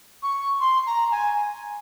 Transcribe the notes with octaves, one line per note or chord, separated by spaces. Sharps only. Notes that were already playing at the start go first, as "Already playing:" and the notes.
C#6
C6
A#5
G#5